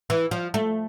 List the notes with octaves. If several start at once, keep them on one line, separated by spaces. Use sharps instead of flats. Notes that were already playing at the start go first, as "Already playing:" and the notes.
E3
F3
A3